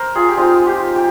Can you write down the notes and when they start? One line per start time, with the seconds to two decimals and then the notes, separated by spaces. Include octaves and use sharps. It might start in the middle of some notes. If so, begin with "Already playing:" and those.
Already playing: A#4 C5
0.15 F4 G#4
0.28 G4
0.37 G#3 C4 D#4 F4
0.62 G4 G#4
0.96 G4